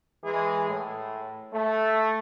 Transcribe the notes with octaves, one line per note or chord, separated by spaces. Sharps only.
E3 G#3 G#4
A2
A3